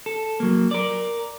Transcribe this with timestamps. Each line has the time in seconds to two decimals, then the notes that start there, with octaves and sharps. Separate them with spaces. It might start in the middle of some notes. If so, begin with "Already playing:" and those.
0.06 A4
0.40 F#3 A#3
0.71 A#4 D5